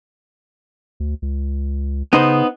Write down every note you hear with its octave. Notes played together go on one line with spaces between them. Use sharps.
D2
C#2
C#3 B3 D#4 C5